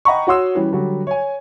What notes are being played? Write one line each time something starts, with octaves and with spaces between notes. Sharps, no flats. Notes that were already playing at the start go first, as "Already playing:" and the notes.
D#5 F#5 G5 A#5 B5 C#6
F#4 C#5 F#5 C6 D#6 E6
E3 G3 C#4
D3 F#3 G3 F#4
C#5 G#5